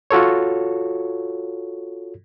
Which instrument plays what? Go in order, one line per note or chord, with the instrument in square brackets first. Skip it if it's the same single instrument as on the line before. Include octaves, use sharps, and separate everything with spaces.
[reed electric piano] F4 F#4 A4 C#5